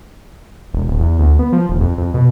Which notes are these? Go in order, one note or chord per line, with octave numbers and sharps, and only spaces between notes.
E1
D1
E2
D2
B3
F3
D#1
F2
F2
B2